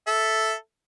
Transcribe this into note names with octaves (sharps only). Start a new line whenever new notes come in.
A4 E5